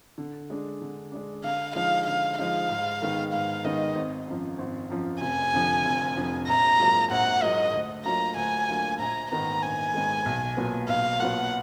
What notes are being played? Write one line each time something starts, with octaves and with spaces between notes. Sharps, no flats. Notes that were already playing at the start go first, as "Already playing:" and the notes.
D3
G#3 D4
D3
G#3 D4
D3 F5
F3 G#3 D#4 F5
D3 F5
F3 G#3 D#4 F5
G#2
D#3 G#3 B3 D#4
G#2 F5
D#3 G#3 B3 D#4 D#5
G#1
F#2 F3
G#1
F#2 F3
F1 G#5
F2 D3 F3
F1
F2 D3 F3
A#1 A#5
G#2 F#3 A#3 F4
A#1 F#5
G#2 F#3 A#3 F4 D#5
D2
D3 F#3 A#3 F4 A#5
D2 G#5
D3 F#3 A#3 F4
A#1 A#5
G#2 D#3 G#3 B3 A#5
A#1 G#5
G#2 D#3 G#3 B3
B1
A#2 F#3 B3
B1 F5
A#2 F#3 B3 F#5